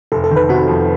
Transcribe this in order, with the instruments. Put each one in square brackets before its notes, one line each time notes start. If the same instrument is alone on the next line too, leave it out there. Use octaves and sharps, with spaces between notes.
[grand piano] F1 [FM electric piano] A4
[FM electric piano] A4
[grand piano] D#3
[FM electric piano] B4
[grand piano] C3 [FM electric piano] F#4
[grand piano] F2